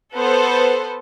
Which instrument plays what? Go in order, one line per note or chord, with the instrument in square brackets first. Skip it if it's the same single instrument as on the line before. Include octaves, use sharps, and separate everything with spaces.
[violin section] B3 A4 B4 C5